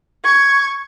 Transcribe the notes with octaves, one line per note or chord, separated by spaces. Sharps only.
C#6 G#6